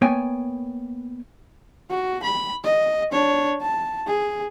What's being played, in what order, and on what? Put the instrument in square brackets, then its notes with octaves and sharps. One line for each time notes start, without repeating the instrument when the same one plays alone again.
[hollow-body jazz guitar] A#3 B3 C#5 G5 G#5
[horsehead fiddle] F#4
B5
D#5
D4 C#5
A5
G#4